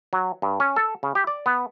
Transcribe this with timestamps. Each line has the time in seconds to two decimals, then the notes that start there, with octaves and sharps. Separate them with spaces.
0.13 F#3
0.42 G2
0.60 C#4
0.76 A4
1.03 C#3
1.15 G4
1.27 D5
1.46 B3